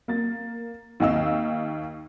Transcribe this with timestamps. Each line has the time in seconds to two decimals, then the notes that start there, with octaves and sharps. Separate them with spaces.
0.08 A#3 A6
1.00 D#2 D#5 F5 E6